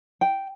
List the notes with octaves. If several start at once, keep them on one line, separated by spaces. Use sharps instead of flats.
G5